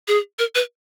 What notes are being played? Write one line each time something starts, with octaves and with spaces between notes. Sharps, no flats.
G#4
A#4
B4